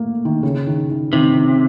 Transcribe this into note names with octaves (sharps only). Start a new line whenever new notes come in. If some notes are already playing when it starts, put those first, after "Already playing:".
Already playing: A3 A#3
D#3
C#3
D#3
D#3
C3 D#3